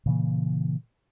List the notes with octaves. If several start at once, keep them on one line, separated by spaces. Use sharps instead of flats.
A#2 C#3 E3 A#3